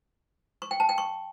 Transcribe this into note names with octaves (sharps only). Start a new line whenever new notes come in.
C#6
G5
A5
G5
C#6